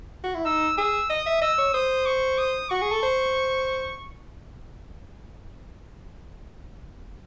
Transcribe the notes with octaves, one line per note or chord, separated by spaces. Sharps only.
F#4
E4
D#4 E6
G#4 E6
D#5 D#6
E5
D#5 E6
C#5
C5 D#6
C#6
D#6
F#4 C#6
G#4
A4
C5